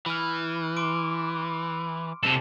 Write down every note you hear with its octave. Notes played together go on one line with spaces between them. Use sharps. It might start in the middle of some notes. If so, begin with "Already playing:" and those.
E3 B5 F6
C6 D6 D7
C3 A4 A5 F#7